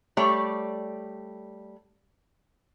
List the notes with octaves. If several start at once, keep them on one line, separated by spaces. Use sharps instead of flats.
G3 A3 C#5 D5